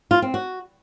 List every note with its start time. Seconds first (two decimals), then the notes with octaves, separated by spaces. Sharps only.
0.11 F4
0.22 C4
0.34 F#4